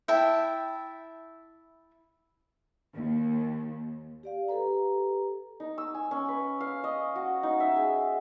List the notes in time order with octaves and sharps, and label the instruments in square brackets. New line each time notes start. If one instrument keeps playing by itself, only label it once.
[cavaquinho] E4 E5 G5 A5
[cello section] D#2
[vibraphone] G4 D5 F5
G4 A4 B4 A#5
[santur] D#4
E6
G#5
C#4
B4
F5
D#5
F#4
D#4
E5
G#4